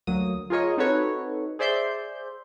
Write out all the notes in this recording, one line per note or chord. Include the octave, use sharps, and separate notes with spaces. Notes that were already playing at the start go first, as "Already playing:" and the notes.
D2 F#3 A#3 D#6
F4 G#4 A#4 C#5 D#5
C4 D#4 F#4 A4 B4 C#5
G#4 C5 D5 E5 C6 G6